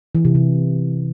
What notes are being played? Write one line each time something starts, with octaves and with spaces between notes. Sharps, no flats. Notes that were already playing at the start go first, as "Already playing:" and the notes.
E3
C3
C3